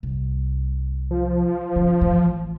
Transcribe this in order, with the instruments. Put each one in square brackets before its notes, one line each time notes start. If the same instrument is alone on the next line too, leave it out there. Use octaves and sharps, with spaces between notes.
[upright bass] C2
[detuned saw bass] F3
[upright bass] C#3
A1 E3